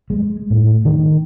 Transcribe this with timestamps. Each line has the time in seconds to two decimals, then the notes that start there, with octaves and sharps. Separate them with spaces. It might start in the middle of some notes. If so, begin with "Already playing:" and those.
0.10 G#3
0.50 A2
0.85 D#3